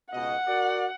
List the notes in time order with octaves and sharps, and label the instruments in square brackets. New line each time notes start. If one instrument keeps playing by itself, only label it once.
[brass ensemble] C#2 B2 D#5 [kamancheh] F#5
[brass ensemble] F#4 A#4 D5